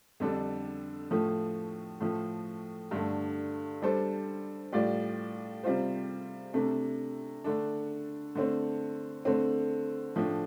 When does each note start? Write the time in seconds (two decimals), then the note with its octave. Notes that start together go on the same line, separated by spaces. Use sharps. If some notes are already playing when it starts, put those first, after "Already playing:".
0.20 F2 D3 G3 D4 A4
1.11 A2 F3 A3
2.01 A2 F3 A3
2.91 G2 D3 A3
3.82 G3 D4 A4 C5
4.72 A2 G3 F4 D5
5.63 C3 G3 F4 C5
6.53 C3 A3 D4
7.44 D3 A3 D4
8.35 D3 A3 C4
9.25 D3 A3 C4
10.16 A2 F3 A3 D4